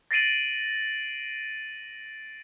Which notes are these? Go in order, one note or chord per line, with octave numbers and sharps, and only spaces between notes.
A6 A#6 C7 D7 D#7 F#7